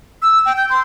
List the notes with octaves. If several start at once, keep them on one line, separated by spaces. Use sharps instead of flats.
E6
G5
G6
C6